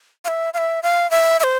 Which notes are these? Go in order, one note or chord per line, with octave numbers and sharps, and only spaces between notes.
F5
E5
F5
E5
F5
E5
E5
C5